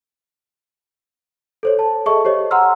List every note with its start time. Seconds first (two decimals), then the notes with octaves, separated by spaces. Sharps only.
1.63 A4 C5 C#5
1.79 A5
2.06 G#4 A4 D#5 E5 A5 C#6
2.25 G4 C5 C#5 D#5
2.51 F#5 A#5 C6 E6 F6